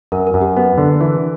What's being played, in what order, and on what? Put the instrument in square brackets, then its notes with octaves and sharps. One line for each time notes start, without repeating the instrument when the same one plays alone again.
[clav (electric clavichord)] F#2 [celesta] A#4
[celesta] A#4
[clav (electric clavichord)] F#2
[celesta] G4
[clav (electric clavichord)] B3
D3
E3